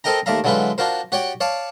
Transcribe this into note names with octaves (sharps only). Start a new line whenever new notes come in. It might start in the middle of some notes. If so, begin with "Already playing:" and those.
C4 A4 A#4 D#5 G5 A#5
D#2 A3 D5 E5 F5 A#5
D3 F#3 G#3 E4 F4 B4
D4 F4 F#4 A#4 C5
F#4 G4 C#5 D5 G5
C#5 D5 F5 A5